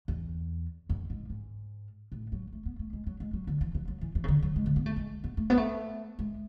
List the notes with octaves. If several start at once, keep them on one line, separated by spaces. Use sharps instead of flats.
E2
F#2
G#2
G#2
A2
F#3
A3
B3
A3
G#3
F#3
G#3
F#3
D3
E3
E3
F#3
E3
E3
C#3
D3
F#3
G#3
D3
B3
A3
G#3
B3
A3
B3
A3
G#3